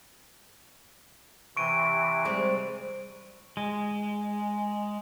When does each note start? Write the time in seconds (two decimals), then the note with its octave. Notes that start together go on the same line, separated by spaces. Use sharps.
1.57 C3 E3 C#6 D7 D#7
2.25 G3 G#3 C4
3.57 G#3